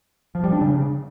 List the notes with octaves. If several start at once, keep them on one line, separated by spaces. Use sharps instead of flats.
F3
G3
D4
C#3